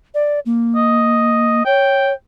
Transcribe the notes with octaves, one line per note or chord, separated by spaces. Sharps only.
D5
A#3
D#5
C#5 G5